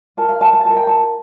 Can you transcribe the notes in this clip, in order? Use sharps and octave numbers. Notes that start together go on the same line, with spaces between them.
F4 A#4 A5
F5
A5
A5
F4 A#4 A5
G5
A5